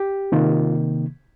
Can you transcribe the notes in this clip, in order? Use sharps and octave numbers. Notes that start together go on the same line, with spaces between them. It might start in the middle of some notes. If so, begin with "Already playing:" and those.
Already playing: G4
C3 D#3 A#3 F4